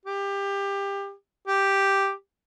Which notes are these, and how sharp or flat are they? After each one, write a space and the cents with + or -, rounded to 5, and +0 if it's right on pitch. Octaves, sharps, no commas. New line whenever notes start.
G4 +20
G4 +0